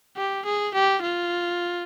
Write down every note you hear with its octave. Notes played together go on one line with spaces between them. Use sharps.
G4
G#4
G4
F4